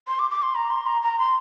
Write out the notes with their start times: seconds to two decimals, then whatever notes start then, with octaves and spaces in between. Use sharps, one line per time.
0.08 C6
0.19 D6
0.31 D6
0.42 C6
0.55 A#5
0.70 C6
0.86 A#5
1.02 A#5
1.19 C6